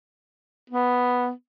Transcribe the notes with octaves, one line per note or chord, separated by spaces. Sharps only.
B3